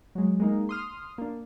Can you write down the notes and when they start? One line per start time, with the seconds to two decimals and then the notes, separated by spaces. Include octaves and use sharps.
0.15 F#3 G#3
0.40 G#3 A#3 D#4
0.69 C6 D#6 F6
1.18 A#3 D4